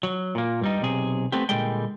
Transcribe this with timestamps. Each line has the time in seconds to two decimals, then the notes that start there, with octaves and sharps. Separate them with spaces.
0.03 F#3
0.35 A#2 A#3
0.62 G2 G3 D#4
0.82 B1 C3 G#4
1.32 A3 B3 C4 G4
1.49 A#2 D3 G3 G#3 G5